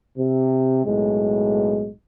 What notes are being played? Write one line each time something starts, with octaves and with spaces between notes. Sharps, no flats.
C3
B1 A2 G#3